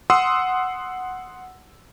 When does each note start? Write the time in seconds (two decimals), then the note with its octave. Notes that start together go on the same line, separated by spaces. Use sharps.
0.10 F#5 C6 D#6 E6 C7